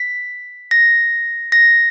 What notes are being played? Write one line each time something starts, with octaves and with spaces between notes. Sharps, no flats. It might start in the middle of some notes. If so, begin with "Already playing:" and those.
Already playing: B6
A#6
A#6